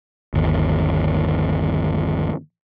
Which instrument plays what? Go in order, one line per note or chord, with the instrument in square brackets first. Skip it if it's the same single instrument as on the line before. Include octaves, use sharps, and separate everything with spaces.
[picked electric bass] G1 D#2